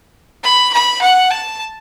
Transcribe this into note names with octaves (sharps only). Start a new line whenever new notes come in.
B5
B5
F#5
A5